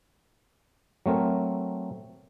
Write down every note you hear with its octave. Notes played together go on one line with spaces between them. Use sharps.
F#3 A3 C4 A#4